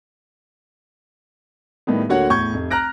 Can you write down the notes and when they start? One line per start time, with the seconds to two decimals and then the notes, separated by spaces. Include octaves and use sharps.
1.87 A2 D#3 G3 B3
2.09 D2 D3 A#3 F#4 C#5 F#5
2.30 E2 A2 C#6 G6 G#6
2.54 F1
2.71 A#5 F6 F#6 A#6 D7